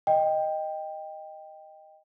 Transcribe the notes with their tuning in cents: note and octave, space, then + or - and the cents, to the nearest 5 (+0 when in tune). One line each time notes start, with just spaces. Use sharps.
D#5 +0 G5 +10